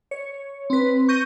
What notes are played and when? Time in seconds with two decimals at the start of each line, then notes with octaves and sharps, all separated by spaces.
0.11 C#5
0.70 C4 B4
1.08 C#6 G6 A#6 D#7